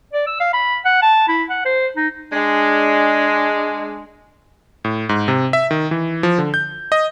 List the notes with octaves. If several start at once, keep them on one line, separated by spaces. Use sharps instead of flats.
D5
E6
F5
B5
F#5
A5
E4
F#5
C5
D#4
G#3 D4
A2
G#2
C3
E5
D#3
E3
F3
D3
G6
D#5